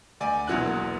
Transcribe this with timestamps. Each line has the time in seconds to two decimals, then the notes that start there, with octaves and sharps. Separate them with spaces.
0.20 D2 D5 G#5
0.47 E1 A#1 E2 F#3 E4 F#6